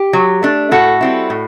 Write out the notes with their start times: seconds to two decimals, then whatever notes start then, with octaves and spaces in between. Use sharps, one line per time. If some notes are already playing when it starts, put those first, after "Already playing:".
Already playing: G4
0.13 F#3
0.43 A3 D4
0.71 A2 F#4 A4
1.01 G3 C4 E4
1.30 A2